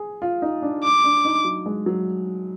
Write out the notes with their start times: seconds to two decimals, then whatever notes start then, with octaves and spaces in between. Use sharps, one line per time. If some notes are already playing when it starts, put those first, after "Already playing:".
Already playing: G#4
0.22 F4
0.42 D#4
0.62 D4
0.84 D6
1.04 D4
1.25 D#4
1.44 F#3
1.66 G#3
1.86 F#3